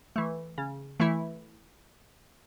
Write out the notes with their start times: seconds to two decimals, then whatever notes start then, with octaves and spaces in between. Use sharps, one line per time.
0.16 E3 A3
0.58 C#3
1.00 E3 A3 E4